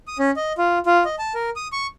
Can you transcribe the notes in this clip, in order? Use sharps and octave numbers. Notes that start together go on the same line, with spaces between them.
D#6
C#4
D#5
F4
F4
D#5
A5
A#4
D#6
C#6